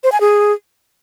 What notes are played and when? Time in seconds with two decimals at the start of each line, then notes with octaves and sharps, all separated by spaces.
0.04 C5
0.12 G#5
0.21 G#4